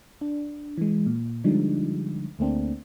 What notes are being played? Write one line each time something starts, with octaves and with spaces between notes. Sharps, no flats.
D4
E3 G#3
A#2
D3 F3 G3 G#3 D4 D#4
D2 A3 A#3 C4 D4